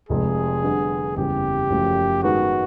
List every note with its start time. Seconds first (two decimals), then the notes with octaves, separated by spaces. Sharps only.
0.09 F1 F2 C3 F3 G#3 G#4
0.63 D3 G3 B3
1.16 F#1 E2 C#3 E3 G3 G4
1.70 F#1 F#2 C#3 F3 A3
2.23 G#2 D#3 G#3 B3 F#4